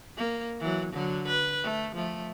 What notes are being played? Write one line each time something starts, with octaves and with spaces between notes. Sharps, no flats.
A#3
E3 F#3
D3 F#3
B4
A3
F3 A3